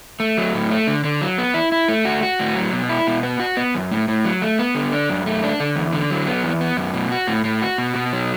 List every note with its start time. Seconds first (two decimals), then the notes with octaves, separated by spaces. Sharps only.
0.20 A3
0.37 F#3
0.54 A2
0.70 A3
0.87 D3
1.04 D3
1.22 F#3
1.38 B3
1.54 E4
1.72 E4
1.89 A3
2.05 F#4
2.23 F#4
2.40 A2
2.56 F#3
2.73 B2
2.89 E4
3.07 B2
3.23 B3
3.40 F#4
3.57 B3
3.75 F#2
3.91 A2
4.08 A2
4.25 F#3
4.42 A3
4.59 B3
4.75 D3
4.92 D4
5.09 F#2
5.26 A3
5.43 D4
5.60 D3
5.76 E2
5.93 D3
6.11 F#3
6.27 B3
6.44 E2
6.61 B3
6.77 F#2
6.94 B2
7.12 F#4
7.27 A2
7.45 A2
7.62 F#4
7.78 B2
7.96 B2
8.13 F#3